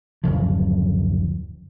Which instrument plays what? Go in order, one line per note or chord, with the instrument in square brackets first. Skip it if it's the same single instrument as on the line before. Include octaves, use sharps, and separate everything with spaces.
[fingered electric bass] D1 F#2 C#3 F3